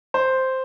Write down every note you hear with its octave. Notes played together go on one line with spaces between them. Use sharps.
C5